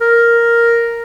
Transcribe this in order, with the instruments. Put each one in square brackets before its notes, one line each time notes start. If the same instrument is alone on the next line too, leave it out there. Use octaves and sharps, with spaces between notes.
[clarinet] A#4